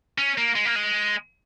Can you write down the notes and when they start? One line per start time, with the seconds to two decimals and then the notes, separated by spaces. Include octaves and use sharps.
0.18 C#4
0.38 A#3
0.55 G#3
0.65 A#3
0.75 G#3